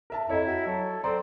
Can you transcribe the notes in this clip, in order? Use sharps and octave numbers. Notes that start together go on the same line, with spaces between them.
A#4 E5 A5
F2 E4 C#5 D#5 A#5
F#4
F#3 A4
C4 A4 D5 A#5